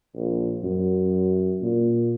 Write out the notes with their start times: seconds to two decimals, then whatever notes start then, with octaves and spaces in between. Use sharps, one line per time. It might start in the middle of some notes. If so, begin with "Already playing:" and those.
0.15 A#1
0.64 F#2
1.62 A#2